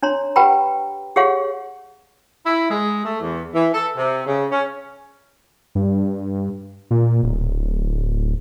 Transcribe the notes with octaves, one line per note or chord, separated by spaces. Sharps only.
D4 C#5 A#5 C6
G4 B4 F#5 G5 A#5 B5
G4 G#4 C#5 F5 F#5
E4
G#3
A3
E2
E3
A4
C3
C#3
C#4
G2
A#2
D1